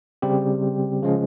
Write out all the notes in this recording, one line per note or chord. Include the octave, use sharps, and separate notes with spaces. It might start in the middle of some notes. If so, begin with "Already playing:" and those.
C#3 G3 C4 G4
C#3 F3 G#3 C#4